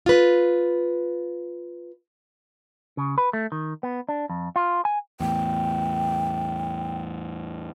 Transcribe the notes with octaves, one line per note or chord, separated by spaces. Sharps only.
F4 B4
C#3
B4
A3
D#3
B3
D4
F2
F4
G#5
E2 A2 G5